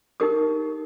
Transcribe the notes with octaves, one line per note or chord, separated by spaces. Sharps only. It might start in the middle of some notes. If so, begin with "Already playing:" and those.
D#4 G4 A#4 D#6